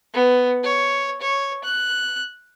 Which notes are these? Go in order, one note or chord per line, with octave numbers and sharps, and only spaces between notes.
B3
C#5
C#5
F#6